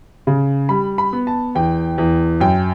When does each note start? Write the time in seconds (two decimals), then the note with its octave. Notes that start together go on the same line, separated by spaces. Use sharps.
0.27 C#3
0.69 G3 B5
0.98 B5
1.13 B3
1.27 A5
1.55 E2 G5
1.98 E2
2.40 F#2 G5